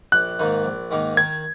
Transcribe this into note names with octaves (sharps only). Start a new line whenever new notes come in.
A#1 F#6
G#2 D#3 A#3 D#4
A#1
G#2 D#3 A#3 D#4
D#3 G#6